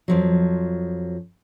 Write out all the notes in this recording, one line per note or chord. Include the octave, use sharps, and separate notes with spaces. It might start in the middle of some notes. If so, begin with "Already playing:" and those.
F2 F3 F#3